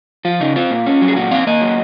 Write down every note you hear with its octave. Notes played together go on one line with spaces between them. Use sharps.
F3 F4
C#3 D#4
C4 F4
A#2
C#4
F#3
G#4
A#2 F#4
C4 F5
A#3 D#5
F#3